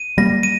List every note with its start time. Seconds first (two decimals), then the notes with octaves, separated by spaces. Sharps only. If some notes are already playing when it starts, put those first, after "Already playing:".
Already playing: D#7
0.18 G3 A#3 A#6
0.43 D#7